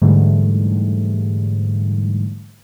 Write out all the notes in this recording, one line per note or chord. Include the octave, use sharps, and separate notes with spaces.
G#2 D3 E3 G3 A3